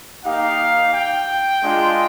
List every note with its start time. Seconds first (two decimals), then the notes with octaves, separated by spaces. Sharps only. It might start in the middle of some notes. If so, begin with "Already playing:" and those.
0.25 A#3 D#4 G4 F5
0.94 G5
1.63 G#3 D4 F4